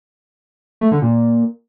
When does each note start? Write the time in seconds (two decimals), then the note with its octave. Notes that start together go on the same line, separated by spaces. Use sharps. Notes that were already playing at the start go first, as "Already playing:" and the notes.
0.81 A3
0.92 D3
1.02 A#2